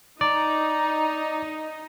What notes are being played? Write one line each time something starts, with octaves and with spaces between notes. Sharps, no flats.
D#4 D5 A#5